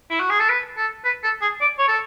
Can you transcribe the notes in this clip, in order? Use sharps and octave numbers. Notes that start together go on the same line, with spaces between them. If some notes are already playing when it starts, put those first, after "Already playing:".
E4
F#4
G#4
A4
B4
A4
B4
A4
G#4
D5
C#5
A4